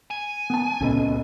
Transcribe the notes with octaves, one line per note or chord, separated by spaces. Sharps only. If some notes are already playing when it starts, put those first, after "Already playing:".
G#5
B3 A5
C#2 A#2 B3 C#4 A4 D#5